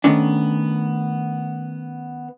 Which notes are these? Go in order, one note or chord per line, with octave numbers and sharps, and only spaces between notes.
D#3 E3 A3 B3 C#4 D4